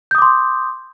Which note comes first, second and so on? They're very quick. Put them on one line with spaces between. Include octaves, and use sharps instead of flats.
G6 D#6 D6 C6